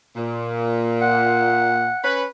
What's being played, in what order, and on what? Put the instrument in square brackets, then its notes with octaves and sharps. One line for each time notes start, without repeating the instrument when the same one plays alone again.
[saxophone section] A#2
[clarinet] F#5
[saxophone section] C#4 B4